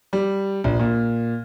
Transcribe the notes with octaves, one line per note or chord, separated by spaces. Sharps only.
G3
A#1
A#2